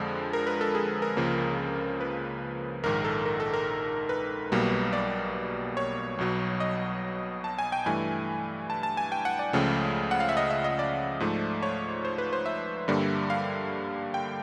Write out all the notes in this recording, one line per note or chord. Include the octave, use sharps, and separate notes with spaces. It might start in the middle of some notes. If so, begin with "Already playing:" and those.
Already playing: F2 D3 F3 G#3
A#4
B4
A4
G#4
A#4
C#2 C#3 F3 A#3
B4
A#1 G#2 D#3 A#4
A4
A#4
A4
A#4
B4
B1 B2 G3 A#3
D5
C#5
B1 B2 F#3
D#5
A5
G#5
G5
G2 E3 A3 G#5
A5
A5
G#5
G5
F#5
D5
C#2 C#3 F3 A3
F#5
F5
E5
D#5
E5
D#5
D5
G#2 F3 A3
C#5
C5
B4
C5
E5
G2 D3 G3 A#3
F5
G5